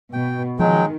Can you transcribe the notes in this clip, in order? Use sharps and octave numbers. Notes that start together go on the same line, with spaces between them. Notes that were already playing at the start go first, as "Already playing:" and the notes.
B2 G5
D#3 F3 F#3 G#3 G5